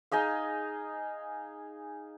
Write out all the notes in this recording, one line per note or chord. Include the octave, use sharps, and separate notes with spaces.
D#4 G#4 D#5 F5